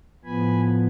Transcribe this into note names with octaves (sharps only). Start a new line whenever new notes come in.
A2 F3 B3 G#5 B5